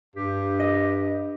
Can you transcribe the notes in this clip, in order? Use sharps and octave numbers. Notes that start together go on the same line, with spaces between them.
G2 G4
D#5